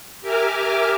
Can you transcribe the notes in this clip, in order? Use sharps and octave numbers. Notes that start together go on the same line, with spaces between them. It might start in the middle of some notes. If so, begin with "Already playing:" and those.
G4 A#4 E5 G#5 D6 F6